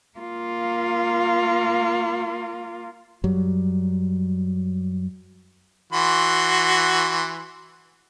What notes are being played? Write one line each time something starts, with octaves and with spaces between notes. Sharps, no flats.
A#3 F4
F#2 F#3 G3
E3 F#4 C6